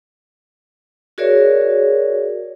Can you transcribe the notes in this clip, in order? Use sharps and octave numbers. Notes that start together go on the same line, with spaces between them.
F#4 G#4 A#4 C#5 D5 E5